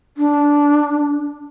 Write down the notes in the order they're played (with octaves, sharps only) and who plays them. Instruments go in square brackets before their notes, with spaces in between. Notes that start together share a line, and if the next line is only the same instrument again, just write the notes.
[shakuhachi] D4